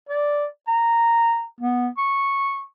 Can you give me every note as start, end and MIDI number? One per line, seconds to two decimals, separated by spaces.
0.09 0.45 74
0.68 1.43 82
1.61 1.89 59
1.98 2.61 85